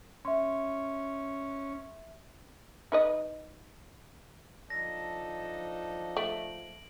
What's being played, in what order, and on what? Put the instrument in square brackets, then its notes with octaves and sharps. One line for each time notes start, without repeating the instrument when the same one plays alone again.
[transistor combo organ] C#4 [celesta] E5 C6
[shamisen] D#4 B4 D#5
[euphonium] F3 [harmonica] D4 D#4 A4 [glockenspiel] A#6
[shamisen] A3 [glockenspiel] D7 F#7